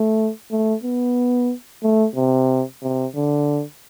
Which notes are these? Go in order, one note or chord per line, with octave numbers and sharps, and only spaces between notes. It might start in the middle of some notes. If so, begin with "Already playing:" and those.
Already playing: A3
A3
B3
A3
C3
C3
D3